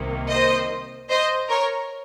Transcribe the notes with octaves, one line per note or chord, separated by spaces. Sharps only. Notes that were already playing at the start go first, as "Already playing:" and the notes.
Already playing: C2 C3 D#3 A#3
C5 D#5
C5 D#5
A#4 C#5